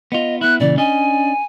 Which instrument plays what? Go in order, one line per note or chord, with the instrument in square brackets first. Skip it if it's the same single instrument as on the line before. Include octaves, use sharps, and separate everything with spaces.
[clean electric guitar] B3 F4 [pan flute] D#5
[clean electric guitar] B3 E4 [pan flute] F#6
[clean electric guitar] A#2 C#3 E3 [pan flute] D5
[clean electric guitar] C#4 D4 D#5 [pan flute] G#5